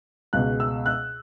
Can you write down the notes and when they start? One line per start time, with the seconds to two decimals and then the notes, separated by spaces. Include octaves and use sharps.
0.33 C#2 B2 G#3 F#6
0.60 E6
0.86 F#6